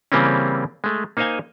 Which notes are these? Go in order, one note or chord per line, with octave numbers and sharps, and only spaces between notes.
C#3 E3 G3 A#3 C4 C#4
G#3 A3
A#3 D#4 C5 D#5 F5 G#5